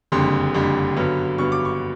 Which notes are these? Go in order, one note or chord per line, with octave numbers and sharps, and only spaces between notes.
F#1 F2 D3 G3 C6
F#1 F2 D3 G3
G2 D3 F#3 B3
G2 D3 F#3 B3 C#6
D6
C#6